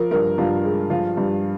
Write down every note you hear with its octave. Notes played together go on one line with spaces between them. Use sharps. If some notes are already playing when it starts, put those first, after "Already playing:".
Already playing: F3 A#4
G2 A#4
G2 F4
G#3
F3 F4
G2